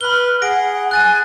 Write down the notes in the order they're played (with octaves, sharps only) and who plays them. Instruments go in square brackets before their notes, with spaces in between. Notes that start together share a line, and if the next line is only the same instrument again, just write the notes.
[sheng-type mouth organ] B4 [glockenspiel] B5 G7 [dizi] F6
[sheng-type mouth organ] G#4 [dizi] F#5 [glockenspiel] A#6 D7
[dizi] G#5 [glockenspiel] F#6 A6 D#7